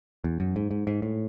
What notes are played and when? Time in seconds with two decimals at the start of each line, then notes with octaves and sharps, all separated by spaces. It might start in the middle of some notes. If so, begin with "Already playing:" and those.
0.24 E2
0.40 F#2
0.56 G#2
0.71 G#2
0.87 G#2
1.02 A2